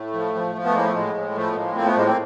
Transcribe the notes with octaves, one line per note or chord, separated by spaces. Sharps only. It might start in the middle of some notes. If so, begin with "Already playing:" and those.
Already playing: A2 A3
F3
F3
F3
A3 B3
A2 G#3 A#3
A3
A2 G#3
A2
F3 A3
B3
A2 G#3 A#3
F3 A#3 C4
A3 B3
A2 G#3 A#3
A#3 C4